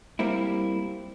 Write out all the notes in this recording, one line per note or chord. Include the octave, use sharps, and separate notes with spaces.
G3 A#3 C4 E4